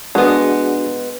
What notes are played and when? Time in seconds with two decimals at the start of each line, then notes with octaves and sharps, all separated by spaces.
0.15 G#3 B3 D4 F#4 G#4